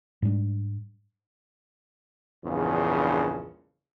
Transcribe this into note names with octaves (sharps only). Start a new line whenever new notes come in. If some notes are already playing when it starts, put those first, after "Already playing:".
G#2 G3 C4 D4
A#1 E2 G2 C#3